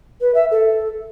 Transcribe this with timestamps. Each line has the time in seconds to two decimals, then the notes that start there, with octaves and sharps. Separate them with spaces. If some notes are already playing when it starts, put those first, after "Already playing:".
0.21 B4
0.34 E5
0.51 A4